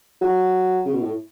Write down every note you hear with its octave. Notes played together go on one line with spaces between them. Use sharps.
F#3
C#3
B2
A2